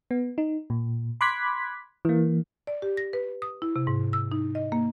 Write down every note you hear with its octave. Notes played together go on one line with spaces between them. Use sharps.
B3
D#4
A#2
B5 C6 D6 F#6 G#6 B6
E3 A#3
D5
G4
A#6
B4
D#6
E4
C3
G#2
E6
D#4
D#5
A#3